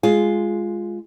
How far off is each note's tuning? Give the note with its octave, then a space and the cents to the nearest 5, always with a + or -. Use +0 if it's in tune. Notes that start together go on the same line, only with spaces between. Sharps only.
G#3 +0 F4 +0